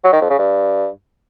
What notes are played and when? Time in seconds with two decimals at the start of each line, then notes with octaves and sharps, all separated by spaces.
0.04 F#3
0.13 D#3
0.21 F2
0.30 C#3
0.39 G2